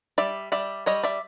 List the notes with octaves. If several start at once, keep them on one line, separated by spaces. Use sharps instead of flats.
G3 D5 E5
G3 D5 E5
G3 C#5 D#5
D5 E5